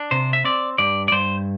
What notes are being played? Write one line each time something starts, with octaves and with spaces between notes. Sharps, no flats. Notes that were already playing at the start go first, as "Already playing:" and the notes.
Already playing: D4
C3 C5
E5
C4 D5
G2 D5
D5
G2 C5